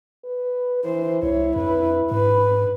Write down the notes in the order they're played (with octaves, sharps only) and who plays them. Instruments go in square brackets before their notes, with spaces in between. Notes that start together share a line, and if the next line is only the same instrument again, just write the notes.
[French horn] B4
[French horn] E3 [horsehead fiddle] C5
[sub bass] C2 [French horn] E4 [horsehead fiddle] C#5
[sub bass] F2 [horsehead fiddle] B4
[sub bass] G#2 [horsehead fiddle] B4